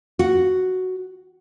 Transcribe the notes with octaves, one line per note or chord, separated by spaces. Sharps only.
F#4